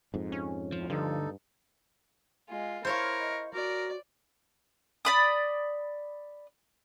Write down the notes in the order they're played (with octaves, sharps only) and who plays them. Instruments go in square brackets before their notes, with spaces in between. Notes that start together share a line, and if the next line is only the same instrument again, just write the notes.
[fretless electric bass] F2 G#2
[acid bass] C#4
[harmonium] D2 A2 [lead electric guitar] F3
[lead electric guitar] D2 D3 [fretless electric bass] G2 [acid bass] F3 [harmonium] D#4 A4
[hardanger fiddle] G#3 F4
[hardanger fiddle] E4 C#6 [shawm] A#4 [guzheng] C5 C#5 F5
[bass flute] D#5
[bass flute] F#4 [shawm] A#4 [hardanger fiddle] D5
[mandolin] D5 B5 D#6